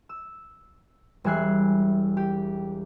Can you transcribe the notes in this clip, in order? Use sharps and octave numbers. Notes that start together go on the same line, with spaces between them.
E6
E1 G3 E5 G#5 F#6 C7
G4